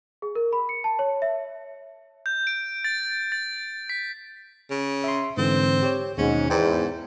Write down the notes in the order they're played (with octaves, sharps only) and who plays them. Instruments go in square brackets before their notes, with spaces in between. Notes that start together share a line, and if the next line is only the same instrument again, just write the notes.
[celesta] G#4
A#4
B5
C#7
A5
C#5
E5
[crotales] G6
D7
A6
A6
B6
[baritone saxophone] C#3
[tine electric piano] E5 C6
[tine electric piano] G#2 D3 E3 [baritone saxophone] C4
[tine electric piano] G4 C#5
[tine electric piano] D#2 B2 G#3 [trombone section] G#2 [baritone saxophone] C#4
[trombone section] E2 [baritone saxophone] G#2 [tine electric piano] G5